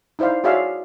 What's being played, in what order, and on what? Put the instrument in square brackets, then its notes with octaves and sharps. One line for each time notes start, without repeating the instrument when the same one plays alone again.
[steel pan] D#4 E4 C5 D5 F5
F#4 G#4 C#5 D5 E5 F5